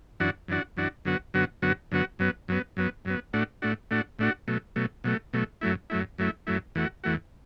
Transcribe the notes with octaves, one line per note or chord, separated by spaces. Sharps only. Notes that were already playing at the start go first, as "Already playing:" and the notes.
F#2 E3 D4 F#4
F#2 E3 D4 F#4
F#2 E3 D4 F#4
F#2 D3 F#3 B3 F#4
F#2 D3 F#3 B3 F#4
F#2 D3 F#3 B3 F#4
F#2 D3 F#3 B3 F#4
F#2 F#3 B3
F#2 F#3 B3
F#2 F#3 B3
F#2 F#3 B3
A2 A3 D4 F#4
A2 A3 D4 F#4
A2 A3 D4 F#4
A2 A3 D4 F#4
B2 F#3 A3
B2 F#3 A3
B2 F#3 A3
B2 F#3 A3
F#2 F#3 A3 E4
F#2 F#3 A3 E4
F#2 F#3 A3 E4
F#2 F#3 A3 E4
E2 E3 A3 F#4
E2 E3 A3 F#4